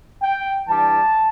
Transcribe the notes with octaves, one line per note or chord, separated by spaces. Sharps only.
G5
E3 G3 D4 A5